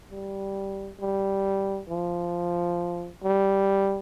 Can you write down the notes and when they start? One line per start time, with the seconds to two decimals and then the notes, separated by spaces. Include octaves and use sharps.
0.11 G3
1.00 G3
1.89 F3
3.24 G3